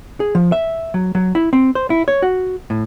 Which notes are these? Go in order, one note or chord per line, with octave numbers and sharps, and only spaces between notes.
G#4
F3
E5
F#3
F#3
E4
C4
C5
E4
C#5
F#4
A2